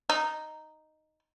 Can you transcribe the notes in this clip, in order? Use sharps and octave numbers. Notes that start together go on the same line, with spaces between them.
D#4